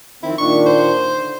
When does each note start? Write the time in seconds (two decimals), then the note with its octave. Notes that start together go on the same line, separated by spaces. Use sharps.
0.23 F2 D#3 C4 E4
0.38 A#2 D#3 D4 C#6
0.66 C5
1.17 D3